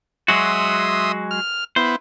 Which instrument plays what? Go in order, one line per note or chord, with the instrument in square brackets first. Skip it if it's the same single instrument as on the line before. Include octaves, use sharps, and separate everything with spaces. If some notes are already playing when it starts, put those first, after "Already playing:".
[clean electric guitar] F#3 G#3 F#4 [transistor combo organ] E5 C6 D#6
[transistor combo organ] F6
[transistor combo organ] B3 E4 [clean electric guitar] C5